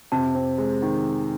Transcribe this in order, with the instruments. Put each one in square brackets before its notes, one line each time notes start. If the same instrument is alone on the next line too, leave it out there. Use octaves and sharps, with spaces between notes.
[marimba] F2 [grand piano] C3
[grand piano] C4
G#3
D#3